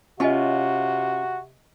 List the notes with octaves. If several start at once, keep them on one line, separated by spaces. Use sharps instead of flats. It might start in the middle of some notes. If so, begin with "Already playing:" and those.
C3 C#4 F4 F#4 D#5 G#5 C#6